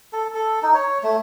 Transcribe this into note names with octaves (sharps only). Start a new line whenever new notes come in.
A4
A4
D#4
C#5
A3